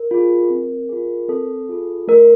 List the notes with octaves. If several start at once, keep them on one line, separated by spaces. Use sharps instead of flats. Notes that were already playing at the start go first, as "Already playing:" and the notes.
Already playing: A#4
F4 G#4
C4
F4 G#4
C4 A4
F4 G#4
A3 A#4